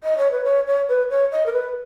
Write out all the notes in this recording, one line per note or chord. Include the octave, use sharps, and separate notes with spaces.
D#5
C#5
B4
C#5
C#5
B4
C#5
D#5
A#4
B4